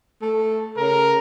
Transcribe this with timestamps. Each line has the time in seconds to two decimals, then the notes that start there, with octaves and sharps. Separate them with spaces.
0.22 A3
0.78 C#3 A#4